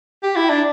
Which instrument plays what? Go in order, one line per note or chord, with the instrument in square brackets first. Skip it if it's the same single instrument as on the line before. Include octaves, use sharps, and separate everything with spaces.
[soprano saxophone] G4
E4
D4